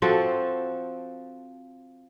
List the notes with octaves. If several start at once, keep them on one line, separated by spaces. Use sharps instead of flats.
F3 C4 F#4 A4